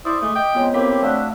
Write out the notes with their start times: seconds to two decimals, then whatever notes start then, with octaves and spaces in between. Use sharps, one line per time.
0.05 E4 C5 D5 D#6
0.22 G#3 A3 D6 D#6
0.35 D#5 G5 D6 B6
0.55 G#3 B3 C4 F4 C#5
0.74 A#3 C4 E4 G4 A4 C#5 B6
1.02 A3 D4 F#4 D5 E5 F5